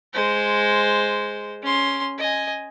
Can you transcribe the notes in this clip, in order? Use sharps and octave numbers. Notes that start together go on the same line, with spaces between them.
G#3 C5
C#4 C6
D#5 G#5